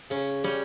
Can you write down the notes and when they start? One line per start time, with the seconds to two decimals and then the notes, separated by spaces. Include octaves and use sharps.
0.10 C#3 C#4
0.44 G3 C#4